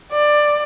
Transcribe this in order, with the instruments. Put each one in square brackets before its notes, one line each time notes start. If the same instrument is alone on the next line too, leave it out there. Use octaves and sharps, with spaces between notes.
[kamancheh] D5